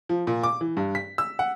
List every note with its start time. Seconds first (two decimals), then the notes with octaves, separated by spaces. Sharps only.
0.09 F3
0.27 A#2
0.44 D6
0.61 E3
0.77 G2
0.95 B6
1.18 E6
1.39 F#5